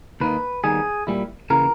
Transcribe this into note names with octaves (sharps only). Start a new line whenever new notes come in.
D#2 D#3 A#3 D#4 B4
D#2 D#3 G3 B3 D#4 G#4
A#2 G3 A#3 E4
C#3 E3 A#3 E4 A#4